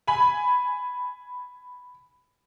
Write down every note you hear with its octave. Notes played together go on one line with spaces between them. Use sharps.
G#5 B5